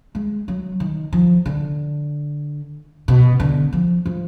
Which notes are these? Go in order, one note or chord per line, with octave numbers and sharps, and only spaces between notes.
G#3
F#3
D#3
F3
D3
B2
D3
F3
F3